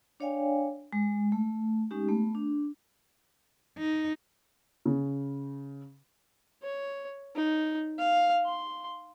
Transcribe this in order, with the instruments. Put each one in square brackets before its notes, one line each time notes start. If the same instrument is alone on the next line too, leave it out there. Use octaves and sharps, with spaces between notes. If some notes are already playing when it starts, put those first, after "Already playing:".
[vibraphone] D4 C#5 D5 F5 G5 G#5
G#3
A3
G#3 C#4 D#4 G4
A3 B3
D4
[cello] D#4
[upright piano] C#3
[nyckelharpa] C#5
D#4
F5
C6